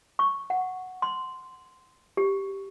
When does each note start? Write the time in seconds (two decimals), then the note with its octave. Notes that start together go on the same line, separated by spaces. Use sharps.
0.19 C#6
0.50 F#5
1.02 C6
2.17 G4